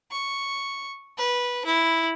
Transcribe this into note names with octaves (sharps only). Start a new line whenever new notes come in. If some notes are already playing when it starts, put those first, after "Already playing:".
C#6
B4
E4